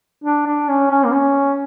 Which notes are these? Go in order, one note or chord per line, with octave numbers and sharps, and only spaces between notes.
D4
D4
C#4
C#4
A#3
C#4